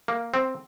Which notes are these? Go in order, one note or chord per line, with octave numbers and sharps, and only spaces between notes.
A#3
C4